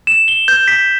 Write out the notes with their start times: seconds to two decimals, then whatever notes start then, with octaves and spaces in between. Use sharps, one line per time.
0.07 E7
0.28 G7
0.48 G6
0.68 B6